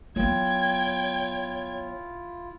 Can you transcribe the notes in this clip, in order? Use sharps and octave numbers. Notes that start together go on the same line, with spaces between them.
F#3 B3 E4 F4 C#5 G5 G#6